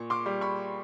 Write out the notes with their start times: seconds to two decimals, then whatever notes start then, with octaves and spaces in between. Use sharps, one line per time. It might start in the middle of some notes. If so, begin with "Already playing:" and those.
Already playing: A#2 C#6
0.10 C6 D6
0.26 G3
0.41 B5 C#6